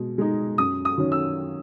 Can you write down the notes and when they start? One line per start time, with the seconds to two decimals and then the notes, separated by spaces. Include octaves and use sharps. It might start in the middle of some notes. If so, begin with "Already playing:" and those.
Already playing: B2 G#3
0.18 G#3 D#4
0.58 F#2 D#6
0.85 D#6
0.98 D#3 F#3 C#4
1.12 E6